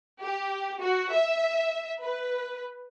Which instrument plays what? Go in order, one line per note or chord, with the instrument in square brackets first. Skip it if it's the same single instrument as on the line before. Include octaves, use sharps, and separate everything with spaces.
[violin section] G4
F#4
E5
B4